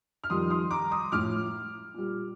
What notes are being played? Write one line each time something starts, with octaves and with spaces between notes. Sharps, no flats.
F6
F2 D#3 G3 C6 D#6
C6 D#6
A#5 D6
C6 D#6
A2 F3 D6 F6
A#2 G3